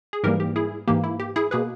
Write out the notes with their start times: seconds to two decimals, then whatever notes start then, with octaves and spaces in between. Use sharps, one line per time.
0.13 G#4
0.23 G#2 E3 G3 A#3 G4 A#4
0.40 G4
0.56 E4 G#4
0.88 G#2 E3 A#3 G4
1.04 E4
1.20 G4
1.36 E4 G#4
1.51 B2 A#3 G#4 B4